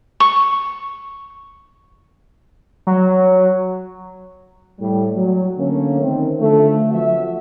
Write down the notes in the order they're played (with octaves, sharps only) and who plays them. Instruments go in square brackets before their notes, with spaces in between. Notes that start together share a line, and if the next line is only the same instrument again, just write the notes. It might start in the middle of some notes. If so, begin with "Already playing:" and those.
[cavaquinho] C#6
[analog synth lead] F#3
[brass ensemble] A2 G3
F#3
D3 A3 A#3 C#4
D#3 C4
D3 F3 A3
F3 F#3 B3 C4 F#4 E5